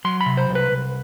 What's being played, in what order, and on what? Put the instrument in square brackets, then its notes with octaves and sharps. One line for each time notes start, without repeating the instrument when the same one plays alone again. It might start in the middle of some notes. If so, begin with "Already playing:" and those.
[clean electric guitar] F#3 C6
B5
C3
C5
C2
B4
C2